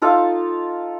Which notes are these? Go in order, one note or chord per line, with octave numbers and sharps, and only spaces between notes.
D#4 F4 A4 F5